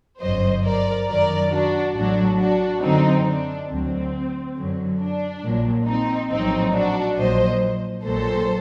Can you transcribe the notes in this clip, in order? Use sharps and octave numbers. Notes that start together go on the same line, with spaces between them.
G1 F#2 F#3 C5 D#5
A#4 D5
F#2 D#3 F#3 A#4 D5
D4 F#4
A1 A2 F#3 D4 F#4
D4 F#4
F#2 D3 F#3 C4 D#4
D4
D2 D3 F#3 C4
F#2 D3 F#3
D4
A#1 A#2 F#3
C4 D#4
A#1 A2 F#3 C4 D#4
D4 F#4
A#1 A#2 F#3 C5 D#5
A#1 A#2 F#3 A4 C5